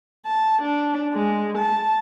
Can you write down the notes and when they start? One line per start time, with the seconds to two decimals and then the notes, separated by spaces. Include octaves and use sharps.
0.26 A5
0.62 D4
1.14 G#3
1.59 A5